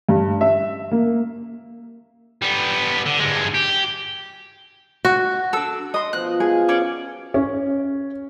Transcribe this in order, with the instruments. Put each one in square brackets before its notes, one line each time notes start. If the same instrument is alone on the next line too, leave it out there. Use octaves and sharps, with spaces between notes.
[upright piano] G2
E5
A#3
[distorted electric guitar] G3 B3
D3
G2 G#3
G4
[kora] F#4
[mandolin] D4 E6 [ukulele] A4
[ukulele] D#5 [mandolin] C6 D#6
[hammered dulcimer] B2 F3 [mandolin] F#6
[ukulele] G#4 [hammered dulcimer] F5 G#5
[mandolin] C#4 C#5 D5
[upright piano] C#4